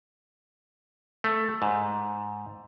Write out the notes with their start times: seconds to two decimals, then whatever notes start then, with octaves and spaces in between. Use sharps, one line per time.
1.24 A3
1.62 G#2